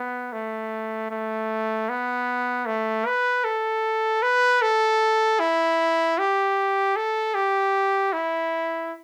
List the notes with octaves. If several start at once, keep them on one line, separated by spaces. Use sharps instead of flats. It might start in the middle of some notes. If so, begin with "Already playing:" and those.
Already playing: B3
A3
A3
B3
A3
B4
A4
B4
A4
E4
G4
A4
G4
E4